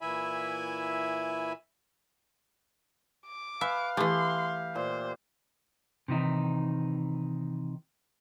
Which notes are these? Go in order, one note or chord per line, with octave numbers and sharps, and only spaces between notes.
A#2 E3 E4 E5 G#5 B5
D6
B4 E5 F5 G#5
E3 A3 G4 E5 C6
A#2 C5
C3 D#3 E3 D#4